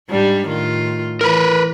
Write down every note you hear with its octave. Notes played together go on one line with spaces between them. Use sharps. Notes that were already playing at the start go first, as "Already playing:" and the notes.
G#2 G3 D4
A2 D#3 F4
E3 A#4 B4